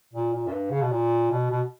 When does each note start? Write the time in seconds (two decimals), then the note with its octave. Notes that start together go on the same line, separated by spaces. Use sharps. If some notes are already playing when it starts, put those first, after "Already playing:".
0.13 A#2
0.33 A#2
0.47 F#2
0.53 G2
0.70 C#3
0.81 B2
0.91 A#2
1.31 B2
1.51 B2